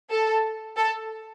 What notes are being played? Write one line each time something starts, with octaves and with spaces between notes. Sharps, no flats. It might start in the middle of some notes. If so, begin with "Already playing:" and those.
A4
A4